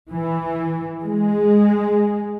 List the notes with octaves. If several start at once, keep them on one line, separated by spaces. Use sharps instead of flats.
E3
G#3